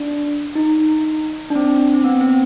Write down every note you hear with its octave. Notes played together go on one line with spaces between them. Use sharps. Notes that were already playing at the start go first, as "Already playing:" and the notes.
Already playing: D4
D#4
D4
C4
C4
B3
C4